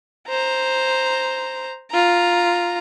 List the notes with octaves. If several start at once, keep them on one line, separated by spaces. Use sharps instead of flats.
C5 A#5
F4 A#5